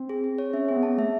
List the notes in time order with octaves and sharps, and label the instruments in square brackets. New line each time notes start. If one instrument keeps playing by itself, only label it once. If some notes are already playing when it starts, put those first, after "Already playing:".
Already playing: [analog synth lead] C4
[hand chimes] G#4
G#4
C#5
[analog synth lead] C#4 [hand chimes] E5
[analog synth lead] C4 [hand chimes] G#4
[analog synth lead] B3
[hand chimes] A5
[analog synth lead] A3 [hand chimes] E5